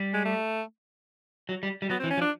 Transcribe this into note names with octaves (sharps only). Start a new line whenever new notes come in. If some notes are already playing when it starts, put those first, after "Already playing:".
Already playing: G3
G#3
A3
F#3
G3
G3
F#3 B3
E3 C4
C#4
F3
D4